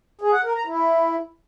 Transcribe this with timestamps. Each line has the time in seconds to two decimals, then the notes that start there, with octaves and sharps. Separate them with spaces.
0.21 G#4
0.33 F#5
0.44 A#4
0.55 A#5
0.67 E4